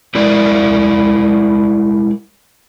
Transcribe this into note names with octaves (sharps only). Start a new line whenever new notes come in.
G3 G#3 E4 A#4 D5